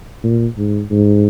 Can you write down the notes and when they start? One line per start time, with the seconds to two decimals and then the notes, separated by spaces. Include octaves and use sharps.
0.23 A#2
0.58 G#2
0.91 G#2